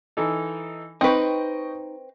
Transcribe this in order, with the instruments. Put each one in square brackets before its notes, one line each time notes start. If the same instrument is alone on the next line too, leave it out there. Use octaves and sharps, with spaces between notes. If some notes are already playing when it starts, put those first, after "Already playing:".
[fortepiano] E3 D#4 A4
[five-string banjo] C4 B4 [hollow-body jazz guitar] D#4 [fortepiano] D#5 G5 C#6